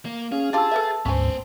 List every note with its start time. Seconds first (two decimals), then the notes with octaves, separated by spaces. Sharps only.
0.05 A#3
0.32 C#4 G#4 F5
0.53 D4 F4 G4 A5 E6 A6
0.72 A4 B4 E5
1.06 D2 G#2 B3 C#4 C5 G#5